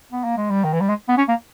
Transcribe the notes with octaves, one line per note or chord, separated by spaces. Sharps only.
B3
A#3
G#3
G3
D#3
E3
G3
G#3
B3
C#4
A#3